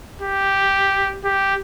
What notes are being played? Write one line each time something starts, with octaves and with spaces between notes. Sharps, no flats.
G4
G4